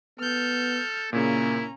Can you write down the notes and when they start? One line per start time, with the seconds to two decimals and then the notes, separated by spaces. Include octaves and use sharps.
0.20 B3 A4 F6 G6
1.13 A#2 C#3 A#3 C#4 E4 A#5